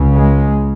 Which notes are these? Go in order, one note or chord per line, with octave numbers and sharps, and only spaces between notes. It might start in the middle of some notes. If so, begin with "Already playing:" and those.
Already playing: C#2 C#3
G#3